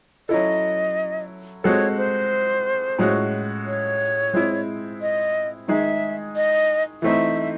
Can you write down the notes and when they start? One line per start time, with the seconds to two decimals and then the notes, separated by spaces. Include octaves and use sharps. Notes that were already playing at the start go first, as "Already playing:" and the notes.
0.29 F#3 C#4 E4 A4 D#5
1.64 G#3 C4 F#4 A4 C#5
1.97 C5
2.98 A2 G#3 C#4 F#4
3.66 C#5
4.33 G#3 C4 E4
5.01 D#5
5.67 D#3 G#3 D#4 G#4 E5
6.36 D#5
7.02 E3 A3 C4 D#4 E5